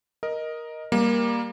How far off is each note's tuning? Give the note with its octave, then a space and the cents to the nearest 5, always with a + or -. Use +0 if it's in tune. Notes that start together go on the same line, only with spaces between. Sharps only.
A#4 +10 D#5 +0
G3 +20 A#3 +15